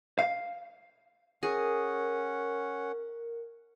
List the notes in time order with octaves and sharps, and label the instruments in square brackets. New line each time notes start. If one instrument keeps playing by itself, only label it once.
[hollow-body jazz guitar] F5
[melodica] C#4 F#5 [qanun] G#4 [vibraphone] A#4